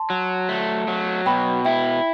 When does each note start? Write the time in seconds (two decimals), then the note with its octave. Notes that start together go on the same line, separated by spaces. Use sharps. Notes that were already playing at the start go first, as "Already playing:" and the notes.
Already playing: A5 C6
0.10 F#3
0.49 A3
0.88 F#3
1.26 B2 G5 B5
1.65 E4 E5 G5